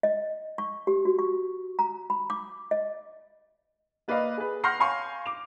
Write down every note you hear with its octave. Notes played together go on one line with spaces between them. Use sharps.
D#5
C#6
G4
F#4
C#6
A#5
B5
D6
D#5
A#3 B4 D5 D#5 F5
G#4 B4
F#5 C6 F6 G6 A#6 C7
C#5 F5 G#5 C6 C#6
D6 F7